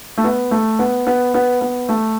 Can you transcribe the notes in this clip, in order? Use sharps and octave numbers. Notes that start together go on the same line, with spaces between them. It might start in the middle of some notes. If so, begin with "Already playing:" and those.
A3
B3
A3
B3
B3
B3
B3
A3